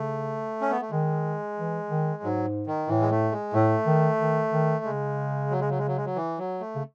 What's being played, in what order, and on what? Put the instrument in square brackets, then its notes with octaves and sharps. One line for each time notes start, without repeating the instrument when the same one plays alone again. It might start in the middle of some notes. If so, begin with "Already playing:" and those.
Already playing: [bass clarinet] C#3 [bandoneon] A3
[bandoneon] C#4
B3
A3
[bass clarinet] D#3 [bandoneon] G#3
[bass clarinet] E3
D#3
[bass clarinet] G#2 [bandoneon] F#3
[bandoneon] D#3
[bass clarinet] A2 [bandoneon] E3
[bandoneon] G#3
A3
G#3
[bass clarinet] A2 [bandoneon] A3
[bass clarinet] D#3
D#3
D#3
[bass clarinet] C#3 [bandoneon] G#3
[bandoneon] F#3
G#3
F#3
G#3
F#3
G#3
F#3
E3
F#3
A3
[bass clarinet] C#3